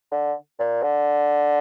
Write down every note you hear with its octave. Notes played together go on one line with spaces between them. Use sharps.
D3
A#2
D3